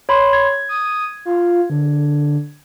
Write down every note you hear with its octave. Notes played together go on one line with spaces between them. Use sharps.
C#5 B5 C6
G#6
D#6
F4
D3